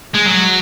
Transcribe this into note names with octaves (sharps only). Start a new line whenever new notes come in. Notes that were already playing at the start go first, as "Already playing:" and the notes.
G#3
F#3